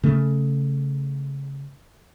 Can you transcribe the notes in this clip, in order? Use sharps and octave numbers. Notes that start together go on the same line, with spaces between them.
C#3 A3